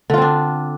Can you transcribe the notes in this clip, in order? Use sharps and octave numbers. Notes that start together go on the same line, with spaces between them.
D3 C4 D4 F4